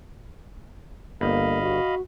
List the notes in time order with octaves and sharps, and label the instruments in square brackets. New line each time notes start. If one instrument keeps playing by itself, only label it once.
[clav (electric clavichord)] G1 [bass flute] A#3 [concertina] D#5 F5 B5
[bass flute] F#4